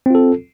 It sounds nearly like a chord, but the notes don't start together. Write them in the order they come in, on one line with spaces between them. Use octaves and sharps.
C4 F4 A4